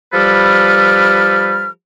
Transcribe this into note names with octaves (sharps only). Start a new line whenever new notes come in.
F3 G3 G4 A4 B4 F6